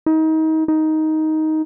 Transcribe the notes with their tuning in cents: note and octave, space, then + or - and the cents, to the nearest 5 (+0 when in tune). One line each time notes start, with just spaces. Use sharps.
D#4 +30
D#4 +10